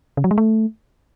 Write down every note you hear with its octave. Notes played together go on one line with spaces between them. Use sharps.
C#3
F#3
G#3
A3